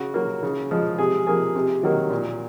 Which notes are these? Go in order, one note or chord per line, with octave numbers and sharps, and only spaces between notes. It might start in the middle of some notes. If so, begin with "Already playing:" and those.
Already playing: C#3 F#4
F#3 A#3
C#3
F3 G#3
C3 G#4
F3 A#3 G#4
C3
D#3 F#3 A#3
A#2